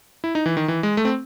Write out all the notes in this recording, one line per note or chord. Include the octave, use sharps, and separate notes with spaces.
E4
D#4
E3
D#3
E3
G#3
A3
C4